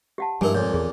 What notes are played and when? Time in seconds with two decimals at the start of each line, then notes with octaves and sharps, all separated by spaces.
0.18 G4 F#5 A5
0.41 G2 F3 G3 G#3 D#4 E4 A#4 G#5
0.55 F2 A#2 C#5
0.73 E2 G#4